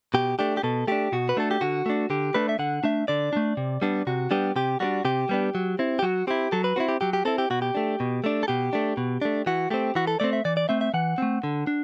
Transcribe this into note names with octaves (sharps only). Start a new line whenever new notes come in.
B2 G4
A3 D4 G4
G4
B2 A4
A3 D4 G4
B2 F#4
B4
A3 D4 A4
G4
D3 F#4
A3 D4
D3 G4
A3 D4 B4
E5
D3 F#5
A3 D4 E5
D3 D5
A3 D4
C3
G3 B3 D4
C3 F#4
G3 B3 D4 G4
C3 G4
G3 B3 D4 F#4
C3 G4
G3 B3 D4
F#3
C4 E4
G4
F#3 F#4
C4 E4 G4
F#3 A4
B4
C4 E4 F#4
G4
F#3 G4
G4
C4 E4 A4
G4
B2 F#4
G4
A3 D4
B2
A3 D4
A4
B2 G4
A3 D4
B2
A3 D4
E3 F#4
A3 C4 G4
E3 F#4
A4
A3 C4 D5
E5
E3 D5
D5
A3 C4 E5
E5
E3 F#5
A3 C4
D3
D4